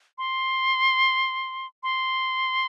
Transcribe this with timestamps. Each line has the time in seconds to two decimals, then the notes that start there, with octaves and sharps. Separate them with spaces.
0.18 C6
1.83 C6